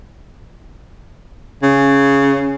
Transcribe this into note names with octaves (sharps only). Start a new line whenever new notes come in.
C#3